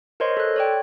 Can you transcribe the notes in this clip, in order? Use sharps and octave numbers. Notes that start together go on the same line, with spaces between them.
A#4 C5 C#5 D#5 C6
A4 F#6
C#5 D5 G5